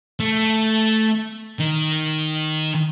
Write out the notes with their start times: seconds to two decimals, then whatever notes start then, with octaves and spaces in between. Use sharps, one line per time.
0.20 A3
1.59 D#3